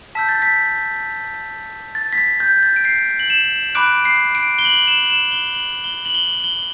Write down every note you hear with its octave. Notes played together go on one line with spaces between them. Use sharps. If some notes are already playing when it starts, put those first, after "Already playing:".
A5 E6 G6 B6
A6
B6
A6
B6
A6
G6
A6
D7
C7
F#7
E7
B5 D6 F#6 D7
C7
D7
G7
F#7
E7
F#7
E7
G7
F#7
G7
F#7
G7
G7